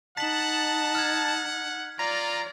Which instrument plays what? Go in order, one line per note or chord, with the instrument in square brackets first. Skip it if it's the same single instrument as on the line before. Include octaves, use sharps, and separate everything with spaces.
[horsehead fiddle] D#4 [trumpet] F#5 [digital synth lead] A5 [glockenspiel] B6 F#7
[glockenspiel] F6 G#6
[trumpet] F4 [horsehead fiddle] D5 [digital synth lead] A#5